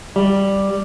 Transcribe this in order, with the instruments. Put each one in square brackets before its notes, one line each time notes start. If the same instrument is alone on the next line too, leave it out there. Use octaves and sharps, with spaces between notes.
[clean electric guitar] G3